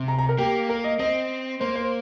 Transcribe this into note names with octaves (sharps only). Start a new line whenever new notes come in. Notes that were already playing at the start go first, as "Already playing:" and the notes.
Already playing: C3
A#5
A#5
A#4
A#3 G4
A#4
D#5
C4 D#5
A#3 C5
C5